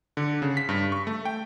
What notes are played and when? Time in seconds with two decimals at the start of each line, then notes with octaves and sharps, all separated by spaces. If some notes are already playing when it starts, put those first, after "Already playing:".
0.17 D3
0.42 C#3
0.57 B6
0.69 G2
0.92 C#6
1.07 A3
1.25 G5